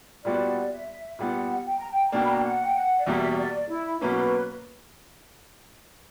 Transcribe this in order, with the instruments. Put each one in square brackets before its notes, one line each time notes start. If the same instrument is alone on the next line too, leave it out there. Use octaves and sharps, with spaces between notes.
[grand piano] A#2 G3 B3 F#4 [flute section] D5
[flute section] E5
[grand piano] A#2 G3 B3 [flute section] F#5
[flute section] G5
A#5
G5
A#5
[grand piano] B2 A#3 D4 [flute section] G5
[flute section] B5
A#5
G5
F#5
G5
F#5
D5
[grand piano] E2 B2 G3 A#3 [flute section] E5
[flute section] D5
E4
[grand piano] B2 F#3 A#3 C#4 [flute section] B4